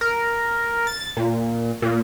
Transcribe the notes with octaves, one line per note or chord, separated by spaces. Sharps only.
A#4
A6
A#2
A#2